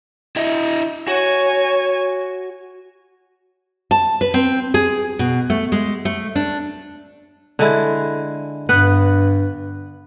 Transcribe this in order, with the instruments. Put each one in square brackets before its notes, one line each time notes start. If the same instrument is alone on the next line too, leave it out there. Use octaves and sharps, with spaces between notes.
[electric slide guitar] E4 D#5 E5
[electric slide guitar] F#4 [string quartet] C#5 G#5
[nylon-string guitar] A5
B4
C4
G#4
B2
A3
G#3
A3
D4
[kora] D3 G#3 E4
[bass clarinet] G2 [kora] B3 B4 F#5